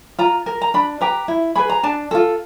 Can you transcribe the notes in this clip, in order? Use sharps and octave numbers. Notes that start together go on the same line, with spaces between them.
F4 A#5
A#4
A#5
D4 B5
G4 B4 A#5
E4
G#4 B4 B5
A#5
D4 A5
F4 A4